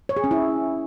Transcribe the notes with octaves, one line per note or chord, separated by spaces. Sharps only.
C#5
G#4
C#4
E4